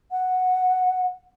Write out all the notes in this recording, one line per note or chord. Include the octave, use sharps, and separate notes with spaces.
F#5